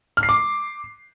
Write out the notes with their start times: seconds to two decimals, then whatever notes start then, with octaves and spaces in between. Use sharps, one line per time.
0.17 F6
0.23 C7
0.29 D6